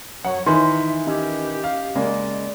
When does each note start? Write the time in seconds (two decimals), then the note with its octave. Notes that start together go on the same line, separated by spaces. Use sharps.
0.25 F#2 F#3 C#5 F#5
0.46 D#3 E3 E5 B5 C6
1.07 C#4 G4 D#5 E5
1.64 F5
1.96 C#3 G#3 A#3 D5